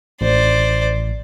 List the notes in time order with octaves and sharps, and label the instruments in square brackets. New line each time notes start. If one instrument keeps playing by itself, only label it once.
[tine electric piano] A1 [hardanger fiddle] C5 D5